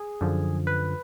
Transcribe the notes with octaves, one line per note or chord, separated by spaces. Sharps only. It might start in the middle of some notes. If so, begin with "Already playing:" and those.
Already playing: G#4
F#2 D3 F3
B4